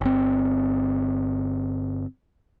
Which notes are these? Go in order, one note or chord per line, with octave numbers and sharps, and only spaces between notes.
G1 C4